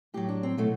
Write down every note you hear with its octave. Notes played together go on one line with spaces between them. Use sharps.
A2 F#3 G4
D4
C4
B2 F#3 A3